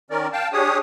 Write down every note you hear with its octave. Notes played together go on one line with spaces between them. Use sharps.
D#3 C#4 A#4 D5
F5 G5 A5
D4 G4 G#4 C#5 D#6